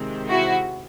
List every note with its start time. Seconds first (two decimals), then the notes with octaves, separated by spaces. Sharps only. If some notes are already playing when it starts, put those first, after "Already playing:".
Already playing: C3 D#3 G#3 C4
0.29 E4 F#4